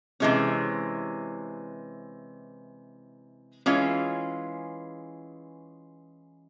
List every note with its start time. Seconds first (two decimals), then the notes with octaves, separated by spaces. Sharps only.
0.20 C3 E3 G#3 C#4
3.66 E3 G#3 C#4 F4